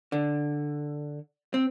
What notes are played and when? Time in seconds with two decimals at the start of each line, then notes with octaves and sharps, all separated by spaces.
0.12 D3
1.54 C4